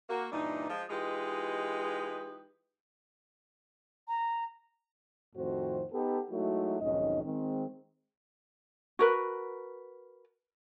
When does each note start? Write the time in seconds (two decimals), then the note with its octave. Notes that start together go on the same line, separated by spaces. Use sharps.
0.10 A#3 F#4
0.32 G2 A#2 E3 D4 D#4
0.70 F3 G#3
0.90 E3 G#3 D#4 F4 G4 B4
4.08 A#5
5.36 F2 A2 D#3 C4 F#4 C5
5.92 B3 D#4 G4 A4
6.31 F#3 G#3 A3 D#4 E4 F#4
6.82 B1 F2 G#2 D#3 C#4 D#5
7.24 D#3 G#3 C4
8.99 F#4 A#4 B4